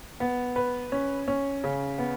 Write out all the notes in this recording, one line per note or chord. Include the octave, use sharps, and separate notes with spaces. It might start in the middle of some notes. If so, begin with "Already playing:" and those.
B3
B4
C#4
C#4
C#3
B3